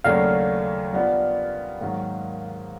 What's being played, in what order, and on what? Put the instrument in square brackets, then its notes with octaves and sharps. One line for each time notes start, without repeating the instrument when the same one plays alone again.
[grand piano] D#2 C#3 F#3 A3 D4 [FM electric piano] F5
[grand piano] G3 B3 D4 F4
G#2 D#3 F#3 A#3